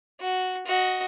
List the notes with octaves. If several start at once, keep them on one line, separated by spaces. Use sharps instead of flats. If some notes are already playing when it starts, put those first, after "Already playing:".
F#4
F#4 D#5